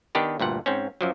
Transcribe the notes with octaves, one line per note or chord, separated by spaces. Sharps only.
D#3 B3 D4 G4 B4
D2 G2 A#2 F#5
G#2 C4 C#4
F#2 F3 F#3